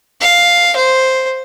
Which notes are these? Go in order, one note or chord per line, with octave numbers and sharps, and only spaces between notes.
F5
C5